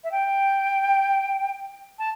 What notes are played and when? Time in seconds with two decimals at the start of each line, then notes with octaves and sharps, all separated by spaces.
0.04 E5
0.11 G5
1.99 A5